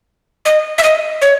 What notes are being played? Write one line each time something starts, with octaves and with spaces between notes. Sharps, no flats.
D#5
E5
D#5
C#5